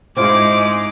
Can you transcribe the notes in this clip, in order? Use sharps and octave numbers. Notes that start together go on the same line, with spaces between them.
G#2 G#3 C4 E4 F4 D6